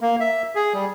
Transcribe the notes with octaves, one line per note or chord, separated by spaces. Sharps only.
A#3
E5
G#4
G3